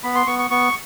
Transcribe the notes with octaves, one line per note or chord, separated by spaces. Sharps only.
B3 B5
C6
B3 C#6
C#6
B3 C#6